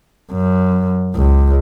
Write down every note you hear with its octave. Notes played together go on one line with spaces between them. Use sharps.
F#2
C#2